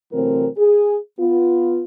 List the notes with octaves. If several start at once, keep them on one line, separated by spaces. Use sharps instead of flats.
C3 E3 F#3 A3 C4 A#4
G#4
B3 F4